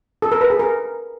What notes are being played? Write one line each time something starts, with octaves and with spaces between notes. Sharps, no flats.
A4
A#4
B4
G#4
A#4